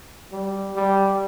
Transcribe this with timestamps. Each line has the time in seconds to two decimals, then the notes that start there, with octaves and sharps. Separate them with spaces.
0.32 G3
0.76 G3